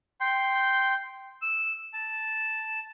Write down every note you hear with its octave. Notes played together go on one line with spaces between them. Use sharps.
G5 C6
E6
A5